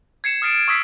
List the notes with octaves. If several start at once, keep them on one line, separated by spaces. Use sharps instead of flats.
G#6 C7 C#7 E7
D#6 F6 A6 C7 D7 E7
C#6 D#6 E6 G#6 B6 C7